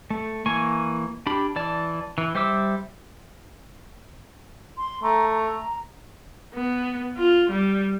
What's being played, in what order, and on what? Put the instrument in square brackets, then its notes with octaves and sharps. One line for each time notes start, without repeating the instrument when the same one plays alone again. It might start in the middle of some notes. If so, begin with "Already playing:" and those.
[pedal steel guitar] A3
E3 A#3 G#5 C#6
D4 G4 B5
E3 D5 A5
E3
G3 C5 E5 D6 E6
[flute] C6
[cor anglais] A3 [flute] A#5
[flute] A#5
[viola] B3
F4
G3